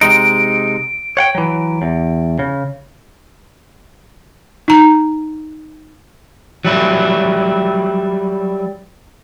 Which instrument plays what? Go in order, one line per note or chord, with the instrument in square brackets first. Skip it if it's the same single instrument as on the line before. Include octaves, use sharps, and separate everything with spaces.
[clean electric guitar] C3 G#3 D#4 [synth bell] D7
[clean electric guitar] C#5 F#5 G5
E3 F#3
E2
C#3
[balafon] D#4 A#5
[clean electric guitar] F#3 G3 E4